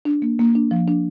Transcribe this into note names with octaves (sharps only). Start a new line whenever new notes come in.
D4
A#3
A#3
D4
F3
D4